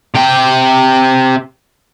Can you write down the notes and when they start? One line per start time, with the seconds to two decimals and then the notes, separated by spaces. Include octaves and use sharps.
0.15 C3 G5